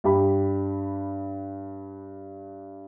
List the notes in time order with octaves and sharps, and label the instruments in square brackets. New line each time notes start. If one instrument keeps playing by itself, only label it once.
[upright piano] G2 G4 B5